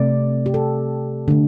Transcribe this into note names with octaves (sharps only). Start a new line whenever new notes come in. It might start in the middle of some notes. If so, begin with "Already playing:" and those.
Already playing: C3 A3 D5
G4
A4
D3 A3